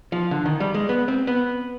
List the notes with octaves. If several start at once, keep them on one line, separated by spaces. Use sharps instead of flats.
F3
D3
D#3
G3
G#3
B3
C4
B3